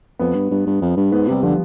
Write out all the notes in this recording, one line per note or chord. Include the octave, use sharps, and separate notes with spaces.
F2 B3
G2
G2
G2
F2
G2
G#2 B3
C3 G3
D3 F3